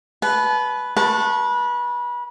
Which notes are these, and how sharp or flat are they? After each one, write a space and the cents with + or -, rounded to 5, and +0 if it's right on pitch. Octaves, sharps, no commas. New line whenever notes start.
B4 +0 A5 -40
B4 -30 A5 +0 C#6 -25